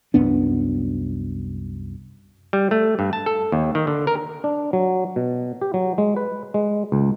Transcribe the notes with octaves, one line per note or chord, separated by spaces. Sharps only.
C2 F#2 B3 D4
G3
A3
G2
A5
A4
D#2
D#3
D3
A#4
D4
F#3
B2
G4
F#3
G#3
B4
G#3
C#2